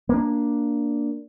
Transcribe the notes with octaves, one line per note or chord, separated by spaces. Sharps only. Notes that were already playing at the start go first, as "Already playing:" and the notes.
A#3 D4